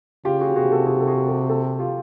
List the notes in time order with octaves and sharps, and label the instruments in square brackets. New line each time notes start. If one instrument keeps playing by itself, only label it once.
[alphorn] C#3 [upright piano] F4 G4
[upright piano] F#4 G#4
[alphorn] C3 [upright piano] F#4 G#4
[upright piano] G4 A4
F#4 G#4
A4
F#4 G#4
G4 A4
G4 A4
F4 G4